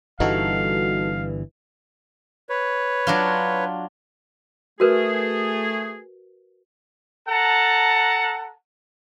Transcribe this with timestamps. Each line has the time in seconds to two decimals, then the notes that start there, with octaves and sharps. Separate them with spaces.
0.20 G1 G2 E3 D#4 F#4 A4 F5
2.49 B4 C#5
3.07 F#3 D4 F4
4.80 A3 F#4 G#4 A#4 B4
7.28 A4 F#5 A5 A#5